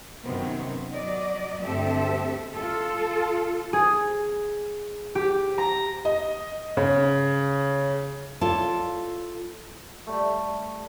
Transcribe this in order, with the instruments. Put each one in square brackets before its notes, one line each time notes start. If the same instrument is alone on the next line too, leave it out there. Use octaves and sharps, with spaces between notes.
[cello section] F#2 C3 D#3 F#3 B3 C4
F#3 D5 D#5
D2 G2 C4 G4 A4 E5
F4 A4
[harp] G#4
G4
A#5
[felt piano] D#5
C#3
[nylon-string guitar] F4 A4 C#5 D5 F5 A5
[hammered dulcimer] G3 A3